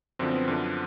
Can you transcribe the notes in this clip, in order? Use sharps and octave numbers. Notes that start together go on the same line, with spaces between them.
F#2 D3 F3 C4
B3
F#2 D3 F3